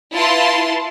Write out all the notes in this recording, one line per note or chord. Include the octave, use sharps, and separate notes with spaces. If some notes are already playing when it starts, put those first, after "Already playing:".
E4 F4 B4 A5 C6